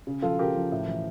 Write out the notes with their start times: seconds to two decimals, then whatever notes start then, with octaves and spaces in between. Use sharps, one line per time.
0.07 C#3
0.22 F3 F4 A4
0.39 C#3 G4 A#4
0.55 F3
0.72 A2
0.87 E3